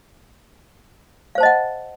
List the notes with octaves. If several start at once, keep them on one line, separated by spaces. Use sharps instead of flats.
C5 D#5 F5 F#5 A5